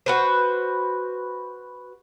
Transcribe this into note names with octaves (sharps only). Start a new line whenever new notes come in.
F#4 B4 C5